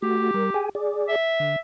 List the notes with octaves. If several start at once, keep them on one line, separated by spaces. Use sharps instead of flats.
A3 F#4 G4
G3 A#4
G#4 G5 G#5
G#4 D5
E5
D3